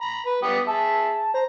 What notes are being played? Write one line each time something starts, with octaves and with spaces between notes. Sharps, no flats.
A#5 B5
B4
G3 B3 G4 D#6
G#4 E5 A5
C5 A#5